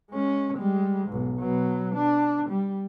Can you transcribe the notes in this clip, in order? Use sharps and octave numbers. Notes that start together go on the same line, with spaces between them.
G#3 C#4
G3 G#3
B1 G#2
B2 F#3
D4
G3